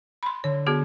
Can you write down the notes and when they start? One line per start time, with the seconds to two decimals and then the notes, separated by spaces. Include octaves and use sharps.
0.23 B5 C6
0.44 D3 C#5
0.67 B3 F#4 G#4